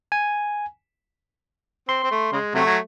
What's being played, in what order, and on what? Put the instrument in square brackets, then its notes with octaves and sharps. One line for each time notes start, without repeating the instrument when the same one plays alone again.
[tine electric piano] G#5
[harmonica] C4 [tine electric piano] C6
[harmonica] C4
A3
C#3 G#3
C3 F#3 A3
F#3